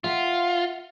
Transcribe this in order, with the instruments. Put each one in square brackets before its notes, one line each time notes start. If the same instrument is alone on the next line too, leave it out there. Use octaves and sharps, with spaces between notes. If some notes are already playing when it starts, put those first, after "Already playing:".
[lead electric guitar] F4 [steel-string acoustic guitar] E5 F#5